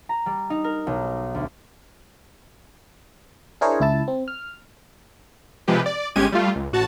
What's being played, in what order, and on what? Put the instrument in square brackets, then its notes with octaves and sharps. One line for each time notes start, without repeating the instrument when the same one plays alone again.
[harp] A#5
G3
D#4
A#4
B1
D2
[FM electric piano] D4 E4 G#4 A#4 C5 C#5
C#2 E4 A5
C4
F6
[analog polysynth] C3 F3 G#3 G4 B4
D5
G1 G#3 C#4 G4 G#6 D#7
G3 A3 F4
C#2
A1 F#4 A5